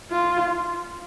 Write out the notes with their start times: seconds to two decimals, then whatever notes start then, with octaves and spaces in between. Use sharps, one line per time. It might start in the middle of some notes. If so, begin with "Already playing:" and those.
0.11 F4